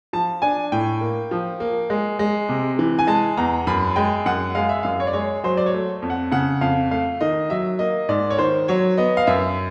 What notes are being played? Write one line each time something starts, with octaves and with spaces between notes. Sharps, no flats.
F3 A5
D4 G#5
A2 G5
A#3
F3
A#3
G#3
G#3
C3
E3
G#5
G#3 A5
E2 A#5
F#2 B5
G#3 G5
F#2 F#5
G#3 F5
E5
F#2 F5
C#5
D5
G#3 C#5
F#3 C5
D5
C#5
A3
F2
F#5
C#3 F#5
F2 F5
A3 F5
D#3 D#5
F#3 E5
A#3 D#5
G#2 D5
C#5
D#3 C5
F#3 C#5
B3 D#5
F5
F#2 E5